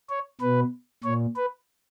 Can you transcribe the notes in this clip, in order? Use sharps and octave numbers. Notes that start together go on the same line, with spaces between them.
C#5
B2 B4
A#2 C#5
B4